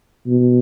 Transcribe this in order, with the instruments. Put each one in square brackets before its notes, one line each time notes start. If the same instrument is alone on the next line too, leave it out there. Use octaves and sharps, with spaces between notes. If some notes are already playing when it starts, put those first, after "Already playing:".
[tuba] B2